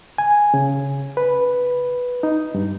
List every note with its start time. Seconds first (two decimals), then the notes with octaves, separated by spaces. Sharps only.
0.18 G#5
0.54 C#3
1.17 B4
2.23 D#4
2.55 G2